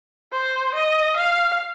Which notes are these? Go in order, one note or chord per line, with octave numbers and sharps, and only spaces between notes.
C5
D#5
F5